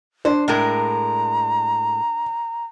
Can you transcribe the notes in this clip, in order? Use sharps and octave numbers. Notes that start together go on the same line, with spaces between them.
D4 C5
A2 G#3 A#4 A#5